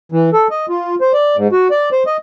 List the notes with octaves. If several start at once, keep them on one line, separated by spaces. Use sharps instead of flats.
E3
A4
D#5
F4
C5
D5
G#2
F#4
D5
C5
D#5